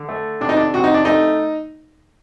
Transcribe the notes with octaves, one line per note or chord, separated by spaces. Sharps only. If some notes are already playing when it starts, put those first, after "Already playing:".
Already playing: D3
A3
C3 D4
D#4
D4
C3 F#4
D#4
D4
A3 D#4